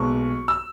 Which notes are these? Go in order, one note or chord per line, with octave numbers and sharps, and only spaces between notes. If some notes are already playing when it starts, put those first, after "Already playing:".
Already playing: B1 A#2 G#3 B3 C#6
E6